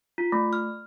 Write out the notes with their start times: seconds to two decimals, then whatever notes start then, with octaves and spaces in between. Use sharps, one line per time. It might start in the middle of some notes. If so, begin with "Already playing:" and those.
0.18 F4
0.32 A3
0.53 F6